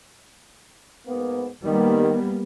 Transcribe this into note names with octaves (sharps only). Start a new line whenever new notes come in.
G#2 A#3 B3
D#3 G3 A#3 B3